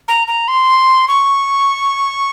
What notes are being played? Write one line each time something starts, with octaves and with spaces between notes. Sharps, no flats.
A#5
A#5
C6
C#6